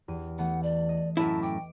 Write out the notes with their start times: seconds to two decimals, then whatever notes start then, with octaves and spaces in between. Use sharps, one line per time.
0.08 E2 G4 D#7
0.39 E3 A3 B3 F#5
0.63 D5
0.89 D#5
1.17 F#2 A2 E4 A5
1.42 G5 D6 D7